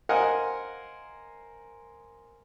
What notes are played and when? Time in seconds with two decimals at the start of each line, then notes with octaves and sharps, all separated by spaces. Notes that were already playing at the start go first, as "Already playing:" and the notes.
0.09 A#4 C5 D#5 F5 F#5 G#5